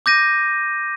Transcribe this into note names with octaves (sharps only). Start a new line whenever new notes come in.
D6 G6 A#6 D#7